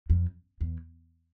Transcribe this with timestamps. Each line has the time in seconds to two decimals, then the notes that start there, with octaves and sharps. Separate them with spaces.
0.10 F2
0.61 E2